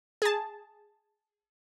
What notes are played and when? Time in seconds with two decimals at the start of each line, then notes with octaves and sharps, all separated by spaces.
0.22 G#4 A5